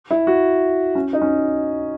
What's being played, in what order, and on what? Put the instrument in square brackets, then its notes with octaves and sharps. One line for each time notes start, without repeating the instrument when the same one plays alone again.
[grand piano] E4
F#4
C#4
D#4
C#4